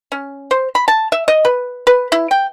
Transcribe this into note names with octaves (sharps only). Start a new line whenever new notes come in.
C#4
C5
B5
A5
E5
D#5
B4
B4
E4
G5